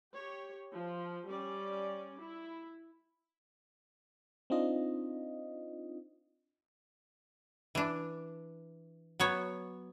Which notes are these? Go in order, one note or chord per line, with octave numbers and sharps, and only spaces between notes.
G4 C#5
F3
G3 C#4 D5
E4
C4 D4 D#4 F4 D#5
E3 D4
F#3 B3 C#5